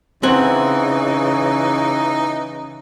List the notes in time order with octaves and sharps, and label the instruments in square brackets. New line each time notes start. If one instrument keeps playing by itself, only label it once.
[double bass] C#3 [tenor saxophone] E3 [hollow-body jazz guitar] C4 F#5 G#5 [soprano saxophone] D#4